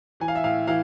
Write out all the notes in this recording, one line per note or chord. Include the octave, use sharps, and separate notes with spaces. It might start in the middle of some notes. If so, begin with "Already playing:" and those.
E3 G#5
F5
E5
A2 F5
E3 F5